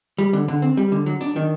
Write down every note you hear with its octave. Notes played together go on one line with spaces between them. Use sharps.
G3
D3
D3
C4
G3
D3
F#3
D4
D#3